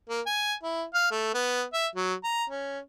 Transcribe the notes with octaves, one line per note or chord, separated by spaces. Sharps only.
A#3
G#5
E4
F5
A3
B3
E5
F#3
A#5
C#4